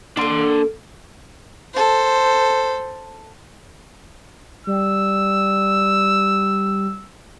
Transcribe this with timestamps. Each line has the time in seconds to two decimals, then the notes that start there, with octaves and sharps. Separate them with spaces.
0.17 A#3 D4 A4 C6
1.74 A4 C5
4.67 G3 E6